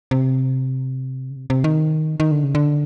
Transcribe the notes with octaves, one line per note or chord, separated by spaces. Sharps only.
C3
C#3
C3
C3
D#3
D#3
D3
C#3
D3